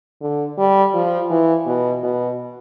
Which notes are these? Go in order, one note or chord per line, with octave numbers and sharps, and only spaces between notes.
D3
G3
F3
E3
B2
B2